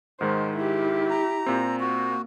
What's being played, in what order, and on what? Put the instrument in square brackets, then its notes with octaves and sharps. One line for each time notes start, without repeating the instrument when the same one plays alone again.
[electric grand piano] G#2 D#3 G#3 [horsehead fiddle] C5
[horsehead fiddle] E4 G4
[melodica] A#5
[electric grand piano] A#2 C4
[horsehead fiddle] A#3 [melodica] F#4